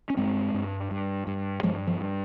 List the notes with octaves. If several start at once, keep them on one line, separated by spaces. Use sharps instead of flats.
C#4
G2 G#3 C4
G2
G2
G2
G2 F3 G#3
F3
G2